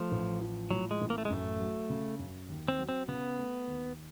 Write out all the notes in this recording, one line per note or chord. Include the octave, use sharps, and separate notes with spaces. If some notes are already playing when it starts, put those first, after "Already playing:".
Already playing: F3 A3
A1
F3
A2 F#3
G#3
A1
A#3
A3
G#3
F#2 A3
F#3
C#3
F#2
D#2
C4
F#3
C4
C#3 B3
A3
D#2